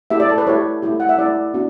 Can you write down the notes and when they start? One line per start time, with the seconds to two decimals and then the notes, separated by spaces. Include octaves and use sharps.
0.10 A3 E4 G4 E5
0.20 D5
0.29 A4
0.38 B4
0.47 A3 E4 G4 C#5
0.82 A3 E4 G4
1.00 F#5
1.09 E5
1.19 A3 E4 G4 D5
1.54 B3 D4 F#4